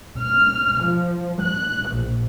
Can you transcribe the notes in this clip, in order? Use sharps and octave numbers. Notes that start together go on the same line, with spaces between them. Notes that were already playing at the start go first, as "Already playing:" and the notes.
F6
F3
F#6
A#1